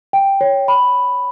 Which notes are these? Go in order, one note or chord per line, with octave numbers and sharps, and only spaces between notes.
G5
C#5
B5